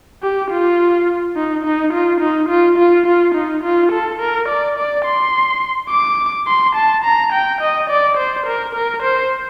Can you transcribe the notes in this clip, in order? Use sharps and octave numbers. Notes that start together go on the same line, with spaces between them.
G4
F4
D#4
D#4
F4
D#4
F4
F4
F4
D#4
F4
A4
A#4
D5
D5
C6
D6
C6
A5
A#5
G5
D#5
D5
C5
A#4
A#4
C5